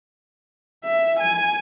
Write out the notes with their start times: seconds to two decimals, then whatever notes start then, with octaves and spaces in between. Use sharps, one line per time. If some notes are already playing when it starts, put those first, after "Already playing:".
0.84 E5
1.20 G#5